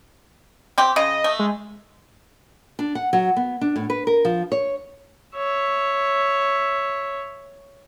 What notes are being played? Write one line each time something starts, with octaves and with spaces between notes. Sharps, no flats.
C4 G4
C#3 D#5
A3
G#3
D4
F#5
F#3
B3
D4
A2
B4
A#4
F3
C#5
C#5 E5